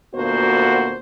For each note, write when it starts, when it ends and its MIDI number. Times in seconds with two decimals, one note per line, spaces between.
0.14 1.00 38
0.14 1.00 46
0.14 1.00 58
0.14 1.00 59
0.14 1.00 66
0.14 1.00 72